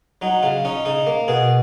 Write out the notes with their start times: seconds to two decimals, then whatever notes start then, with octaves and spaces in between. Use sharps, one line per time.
0.22 F#3 D#4
0.43 C#3 F4
0.65 C#4 D#4
0.85 C#3 D#4
1.07 A#3
1.28 B2 G#4